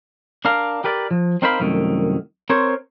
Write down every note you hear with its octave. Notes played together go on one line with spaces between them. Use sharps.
D4 A#4 F5 A#5
G4 A#4 B4 D5
F3
C4 D#4 A#4 C5 F5 B5
C2 F#2 D#3 A3
C4 A#4 C5 C#5